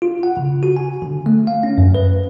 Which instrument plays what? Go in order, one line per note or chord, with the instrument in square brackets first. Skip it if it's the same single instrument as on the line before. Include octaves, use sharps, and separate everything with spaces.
[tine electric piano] F4
F#5
C#3
F#4
G#5
D3
A3
F5
C#4
F#2
B4